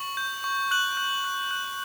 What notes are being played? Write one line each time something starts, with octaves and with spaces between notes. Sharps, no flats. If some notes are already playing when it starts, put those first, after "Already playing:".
Already playing: C#6 F#7
G6
C#6
F#6 F#7
F#6
F#6
F#6